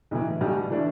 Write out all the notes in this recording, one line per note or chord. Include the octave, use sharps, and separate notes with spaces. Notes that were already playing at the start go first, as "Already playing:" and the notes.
B1 A2 E3
B1 B2 G3
E3 A3 D4